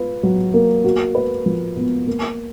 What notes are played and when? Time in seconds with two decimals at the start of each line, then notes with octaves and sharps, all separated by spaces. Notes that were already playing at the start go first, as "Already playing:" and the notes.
Already playing: F4 B4
0.23 F#3
0.54 A#3
0.84 F#4
1.15 B4
1.46 F3
1.76 B3
2.07 A#3